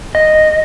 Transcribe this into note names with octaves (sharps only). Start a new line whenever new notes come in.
D#5